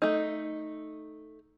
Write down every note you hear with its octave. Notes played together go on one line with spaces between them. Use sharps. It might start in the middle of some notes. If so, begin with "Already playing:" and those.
A3 D#4